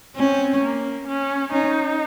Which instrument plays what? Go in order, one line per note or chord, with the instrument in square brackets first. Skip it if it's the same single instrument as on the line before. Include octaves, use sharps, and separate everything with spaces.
[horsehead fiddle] C4 [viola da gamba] C#4
[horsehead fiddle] A#3
C#4
[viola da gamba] C#4 [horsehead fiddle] D#4